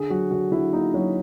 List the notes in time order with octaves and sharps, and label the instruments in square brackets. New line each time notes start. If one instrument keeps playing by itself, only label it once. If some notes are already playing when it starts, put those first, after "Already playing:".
Already playing: [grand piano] D3 G#4
F#3 F#4
D3 F#4
D3 E4
A#3 D#4
F#3 C#4